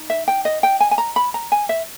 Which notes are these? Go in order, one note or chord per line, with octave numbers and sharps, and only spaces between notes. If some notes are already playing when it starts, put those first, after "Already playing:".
Already playing: D#4
E5
G5
D#5
G5
G#5
G#5
A#5
B5
A#5
G#5
E5